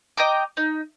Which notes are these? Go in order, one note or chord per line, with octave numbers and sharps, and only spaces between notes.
D#5 G5 A#5 D6
D#4